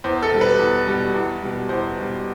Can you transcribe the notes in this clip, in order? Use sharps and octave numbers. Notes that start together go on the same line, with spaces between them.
E2 C5
A4
B2 G3
B4
E2
B2 G3
E2
B2 G3
E2 C5
B2 G3